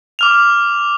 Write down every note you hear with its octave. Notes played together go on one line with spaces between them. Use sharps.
D6 F6 F7